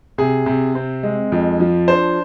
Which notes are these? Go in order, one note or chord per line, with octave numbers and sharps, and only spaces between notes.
C3 G#4
C3
C4
G#3
F2
F3
D4 C5